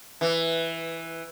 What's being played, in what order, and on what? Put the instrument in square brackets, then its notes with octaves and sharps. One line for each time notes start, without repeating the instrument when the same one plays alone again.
[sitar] E3